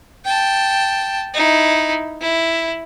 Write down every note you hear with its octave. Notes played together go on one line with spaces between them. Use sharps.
G5 A5
D#4 E4
E4